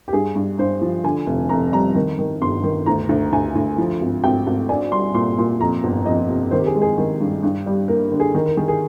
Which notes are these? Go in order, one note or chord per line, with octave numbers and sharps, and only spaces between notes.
G4
G2 G#4
G2
G2 C5
F3
D3 G#5
F1
F1 A#5
G3 A#5
D#3
D#3
G1 C6
D#3
D2 A#5
D2
D2 G#5
D2
F3
G#1
G#1 G5
G#1
D4 G#5
G3 C6
A#2 C6
A#2
F2 A#5
G1
F2 D#5
C3
D#3 C5
G4
G#4
G#3
G#4
D#3
G2
G2
G3
A#3 A#4
D3
G#4
D#3 A#4
A#4
D#3 G#4
G#4